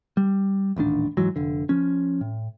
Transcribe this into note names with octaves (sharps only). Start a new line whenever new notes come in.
G3
D#1 A1 D#3 D4
G#2 E3 F#3
F1 D3
F3 C#4
A2